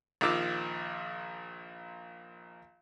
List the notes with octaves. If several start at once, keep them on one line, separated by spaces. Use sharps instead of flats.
A#1 D#3 F3 D6 E6